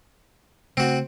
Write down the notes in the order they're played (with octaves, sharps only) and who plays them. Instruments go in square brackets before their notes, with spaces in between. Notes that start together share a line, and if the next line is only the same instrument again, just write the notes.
[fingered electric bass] C#3 A3 [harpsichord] C4 F#4